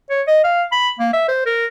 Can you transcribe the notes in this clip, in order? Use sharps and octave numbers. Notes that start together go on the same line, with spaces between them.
C#5
D#5
F5
B5
A#3
E5
C5
A#4